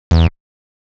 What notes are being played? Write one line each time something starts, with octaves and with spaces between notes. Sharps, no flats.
E2